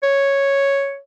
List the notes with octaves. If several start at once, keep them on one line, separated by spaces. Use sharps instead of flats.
C#5